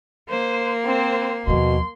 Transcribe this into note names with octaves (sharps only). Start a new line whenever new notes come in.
A#3 C5
C4 C5
D#2 B2 F3 C6